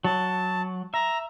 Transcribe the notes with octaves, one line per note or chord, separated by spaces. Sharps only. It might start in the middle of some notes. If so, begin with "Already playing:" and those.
F#3 A5
E5 A#5